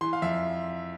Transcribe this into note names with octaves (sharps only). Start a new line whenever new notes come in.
E3 C6
F5
F2 E5